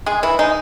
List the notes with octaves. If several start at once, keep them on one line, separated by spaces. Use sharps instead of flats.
G#3 G#4
E3 E4
G#3 D#4